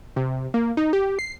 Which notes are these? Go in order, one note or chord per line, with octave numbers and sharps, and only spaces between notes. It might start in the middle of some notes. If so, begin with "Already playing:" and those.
C3
A#3
D#4
G4
C7